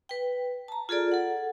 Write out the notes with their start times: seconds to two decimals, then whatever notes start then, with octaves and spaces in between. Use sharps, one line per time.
0.09 B4 G5
0.68 A5 A#5
0.89 F4 G#4 A4 D5
1.12 A4 F#5